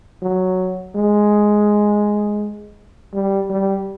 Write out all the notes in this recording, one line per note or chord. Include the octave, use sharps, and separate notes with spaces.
F#3
G#3
G3
G3